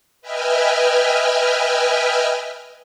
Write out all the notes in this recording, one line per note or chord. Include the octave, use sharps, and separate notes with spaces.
B4 D#5 E5 G5 G#5 F6